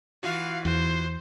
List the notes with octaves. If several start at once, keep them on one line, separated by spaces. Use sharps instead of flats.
E3 F4 F#4 F5
E2 C5